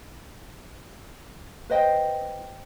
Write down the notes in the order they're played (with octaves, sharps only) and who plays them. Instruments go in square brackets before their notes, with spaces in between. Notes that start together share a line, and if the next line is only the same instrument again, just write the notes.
[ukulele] B4 C5 D#5 G5